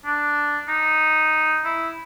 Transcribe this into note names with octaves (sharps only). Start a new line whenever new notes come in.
D4
D#4
E4